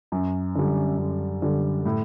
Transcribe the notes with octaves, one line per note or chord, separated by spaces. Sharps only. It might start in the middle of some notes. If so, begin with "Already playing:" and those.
F#2
D3 G3
F#2
D3 G3
A2